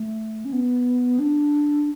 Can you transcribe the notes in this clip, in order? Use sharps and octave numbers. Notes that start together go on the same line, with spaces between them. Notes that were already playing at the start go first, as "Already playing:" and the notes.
Already playing: A3
C#4
B3
D4